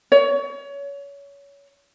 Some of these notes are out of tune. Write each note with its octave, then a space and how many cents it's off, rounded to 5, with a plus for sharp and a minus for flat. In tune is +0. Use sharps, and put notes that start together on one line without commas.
C#5 +25